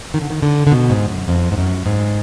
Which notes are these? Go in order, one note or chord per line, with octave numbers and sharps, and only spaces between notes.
D#3
D3
D#3
D3
D3
B2
G#2
F#2
F2
G#2
F#2
G#2